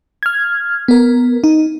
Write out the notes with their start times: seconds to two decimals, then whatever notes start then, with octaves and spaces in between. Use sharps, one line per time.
0.23 F6 G#6
0.88 B3 A#4
1.44 D#4